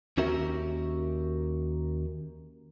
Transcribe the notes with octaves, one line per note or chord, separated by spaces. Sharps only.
D#2 C#4 F#4 G4 A#4 E5